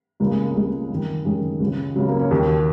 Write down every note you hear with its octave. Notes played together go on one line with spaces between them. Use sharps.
C#2 C#3 A#3
G#3
A#3
C#2 C#3 G#3
F#2 D#3
F#2 D#3 G#3
C#2 C#3
C#2 C#3 F#3
A#3
C#4
D#2 D#3 F#4